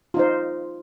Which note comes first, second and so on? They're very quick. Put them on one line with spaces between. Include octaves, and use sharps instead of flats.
F4 D#4 C5